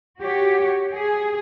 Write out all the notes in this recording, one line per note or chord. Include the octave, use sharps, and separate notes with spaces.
F#4 G4 C#5
G#4